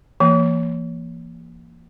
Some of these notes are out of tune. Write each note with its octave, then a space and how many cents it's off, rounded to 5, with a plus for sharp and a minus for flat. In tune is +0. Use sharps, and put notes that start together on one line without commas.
E3 +40 A#3 +0